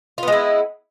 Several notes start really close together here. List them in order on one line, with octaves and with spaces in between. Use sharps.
F4 B3 G#3 E4